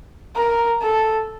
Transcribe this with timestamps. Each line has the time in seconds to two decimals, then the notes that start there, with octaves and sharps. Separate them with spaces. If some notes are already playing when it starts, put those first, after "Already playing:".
0.36 A#4
0.82 A4